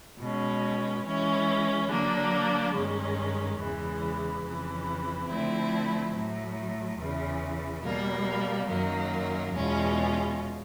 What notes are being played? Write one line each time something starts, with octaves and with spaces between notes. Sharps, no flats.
B2 G#3 C#4
E3 G#3 C#4
D3 F#3 A#3 D4
G2 D#3 G#3 C#4
E2 C#3 E3 G#3
F2 C#3 E3
D3 F3 A3 C4 E4
A2 F#3 A3
E2 C#3 E3
B2 G3 A#3
F#2 D#3 F#3 A#3
E2 B2 G#3 C#4 F4